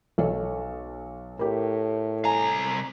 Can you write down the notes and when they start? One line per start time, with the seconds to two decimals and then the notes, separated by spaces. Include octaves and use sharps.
0.18 B1 A4 C#5
1.39 A2 G4 A#4
2.25 C2 G#5 A#5